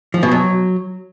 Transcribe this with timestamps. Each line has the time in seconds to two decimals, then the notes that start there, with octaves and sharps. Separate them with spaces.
0.14 F3
0.23 B2
0.31 F#3